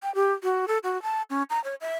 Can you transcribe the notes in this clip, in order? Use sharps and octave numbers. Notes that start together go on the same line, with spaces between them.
G5
G4
F#4
A4
F#4
A5
C#4
A#5
C#5
E5